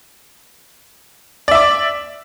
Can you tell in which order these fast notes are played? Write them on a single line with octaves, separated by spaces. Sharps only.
D5 E5 D6